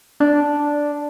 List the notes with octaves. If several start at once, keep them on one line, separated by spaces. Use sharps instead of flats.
D4